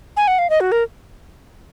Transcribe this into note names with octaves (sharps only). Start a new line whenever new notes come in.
G#5
F#5
F5
D#5
F#4
A#4